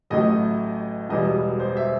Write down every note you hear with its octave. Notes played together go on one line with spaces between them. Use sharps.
A1 A2 F#3 A3 D#5
E1 E2 B2 G3 D#5
C5
E5